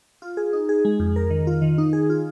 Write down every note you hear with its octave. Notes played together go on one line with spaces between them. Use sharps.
F4
G#4
D#4
G#4
G#3
F2
A#4
D#3
F4
D#3
D#4
G#4
F4